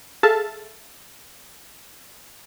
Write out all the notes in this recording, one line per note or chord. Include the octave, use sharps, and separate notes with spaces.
G#4 A4 E5 F5 A5